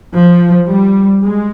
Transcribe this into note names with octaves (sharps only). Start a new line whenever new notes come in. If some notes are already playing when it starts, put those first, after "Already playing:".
F3
G3
G#3